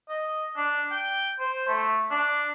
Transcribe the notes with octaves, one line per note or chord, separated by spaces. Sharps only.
D#5
D4
G5
C5
A3
D4